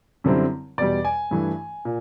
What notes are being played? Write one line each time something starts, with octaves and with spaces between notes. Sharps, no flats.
F#2 D3 G3 C4 E4
E2 B2 G3 D5
G#5
G2 E3 A3
A#2